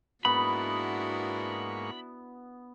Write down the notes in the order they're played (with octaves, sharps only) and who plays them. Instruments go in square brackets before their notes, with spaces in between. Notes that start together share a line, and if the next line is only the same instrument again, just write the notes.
[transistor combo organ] G#2 A#3 C#6 [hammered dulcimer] B3 [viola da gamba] D4 E4 F#4 [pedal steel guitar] B5